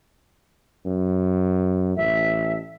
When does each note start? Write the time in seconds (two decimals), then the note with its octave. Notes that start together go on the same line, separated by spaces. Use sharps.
0.86 F#2
1.96 A1 E5